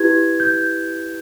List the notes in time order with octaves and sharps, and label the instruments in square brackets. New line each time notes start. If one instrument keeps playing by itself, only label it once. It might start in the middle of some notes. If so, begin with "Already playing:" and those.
Already playing: [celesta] E4 G4 B4 G#6
G6